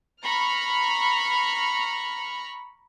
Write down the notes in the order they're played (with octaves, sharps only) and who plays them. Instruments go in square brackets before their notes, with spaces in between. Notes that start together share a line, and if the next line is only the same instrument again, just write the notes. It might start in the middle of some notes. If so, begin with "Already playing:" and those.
[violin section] A#5 B5 C#6 F6